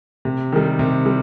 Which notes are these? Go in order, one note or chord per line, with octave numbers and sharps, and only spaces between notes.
C3
D#3 G3
C3
G3